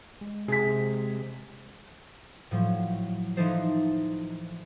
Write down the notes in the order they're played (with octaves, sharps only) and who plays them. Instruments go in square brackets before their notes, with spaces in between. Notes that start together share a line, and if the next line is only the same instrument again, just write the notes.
[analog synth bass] G#3
[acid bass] C3 [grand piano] G#4 B6
[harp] A2 F3 F#3
E3 F3 D#4 E4 A4 C5